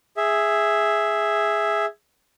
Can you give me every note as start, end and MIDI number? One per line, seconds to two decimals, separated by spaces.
0.17 1.86 68
0.17 1.86 76